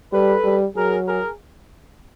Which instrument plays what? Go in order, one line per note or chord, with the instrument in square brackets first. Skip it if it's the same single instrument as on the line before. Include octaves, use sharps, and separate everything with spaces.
[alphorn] G3 [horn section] A4 B4
[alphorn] G3
[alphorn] F#3 [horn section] G#4 A#4
[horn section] G#4 A#4